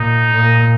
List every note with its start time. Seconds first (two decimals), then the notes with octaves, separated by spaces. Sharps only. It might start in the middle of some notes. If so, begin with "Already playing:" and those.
Already playing: A#2 D#4
0.30 A#2